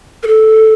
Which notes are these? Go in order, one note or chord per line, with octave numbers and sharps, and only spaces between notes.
A#4
A4